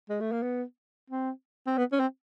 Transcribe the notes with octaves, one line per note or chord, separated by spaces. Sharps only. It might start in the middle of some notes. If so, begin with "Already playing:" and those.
G#3
A3
A#3
B3
C4
C4
B3
C#4
C4